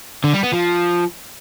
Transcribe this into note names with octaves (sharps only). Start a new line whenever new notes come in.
D3
G3
B3
F3